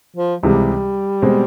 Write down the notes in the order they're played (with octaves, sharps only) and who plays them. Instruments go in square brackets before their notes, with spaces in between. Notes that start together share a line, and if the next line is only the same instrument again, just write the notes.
[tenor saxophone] F3
[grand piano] C#2 C3 E3 G#3 [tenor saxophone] G3
[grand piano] B2 G#3 C4